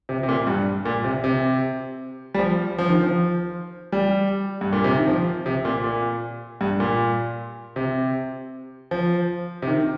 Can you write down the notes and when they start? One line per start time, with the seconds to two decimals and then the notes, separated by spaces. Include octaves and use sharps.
0.09 C3
0.23 C3
0.29 A#2
0.47 G2
0.85 A#2
1.05 C3
1.24 C3
2.34 G3
2.39 F3
2.78 F3
2.89 D#3
3.03 F3
3.92 G3
4.61 G2
4.73 A#2
4.84 C3
4.96 D#3
5.08 F3
5.46 C3
5.65 A#2
5.84 A#2
6.61 G2
6.80 A#2
7.76 C3
8.91 F3
9.62 C3
9.68 D#3